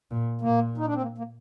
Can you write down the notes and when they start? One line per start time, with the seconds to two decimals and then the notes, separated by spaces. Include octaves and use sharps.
0.11 A#2
0.41 A#2 A#3
0.78 D#4
0.86 D4
0.94 C4
1.02 A#3
1.18 A#3